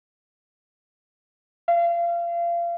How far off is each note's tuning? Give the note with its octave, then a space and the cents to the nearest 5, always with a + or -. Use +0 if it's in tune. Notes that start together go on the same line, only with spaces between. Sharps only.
F5 -30